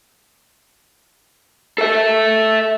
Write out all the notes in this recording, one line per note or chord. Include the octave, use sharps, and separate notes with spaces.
A4 E5